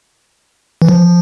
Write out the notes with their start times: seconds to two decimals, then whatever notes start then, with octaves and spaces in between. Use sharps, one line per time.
0.82 E3
0.89 F3